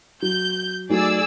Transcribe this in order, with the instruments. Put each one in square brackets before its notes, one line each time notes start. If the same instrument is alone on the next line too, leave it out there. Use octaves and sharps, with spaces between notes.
[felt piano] F#3 [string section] G6
[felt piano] F#3 A3 D#4 [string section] G#4 D5 E6